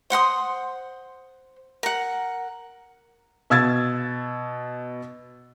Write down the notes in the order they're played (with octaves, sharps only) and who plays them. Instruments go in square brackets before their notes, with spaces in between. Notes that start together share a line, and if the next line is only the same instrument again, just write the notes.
[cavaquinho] C5 F#5 C6 D#6
A#4 F#5
[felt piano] B2 E6 G#6 A6